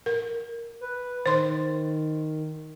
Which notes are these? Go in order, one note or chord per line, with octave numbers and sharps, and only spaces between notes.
A#4
B4
D#3 C5 C6